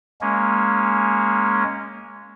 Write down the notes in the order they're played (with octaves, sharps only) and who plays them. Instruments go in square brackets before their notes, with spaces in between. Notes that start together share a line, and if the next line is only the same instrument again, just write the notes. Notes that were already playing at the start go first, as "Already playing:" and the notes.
[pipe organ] G#3 A#3 C#4